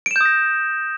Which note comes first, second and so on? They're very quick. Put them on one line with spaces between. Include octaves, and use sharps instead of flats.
D7 E7 G6 D#6 A#6